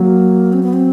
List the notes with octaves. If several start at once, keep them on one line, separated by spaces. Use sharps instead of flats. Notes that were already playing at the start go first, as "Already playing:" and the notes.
Already playing: F#3 A#3
C4
B3
C4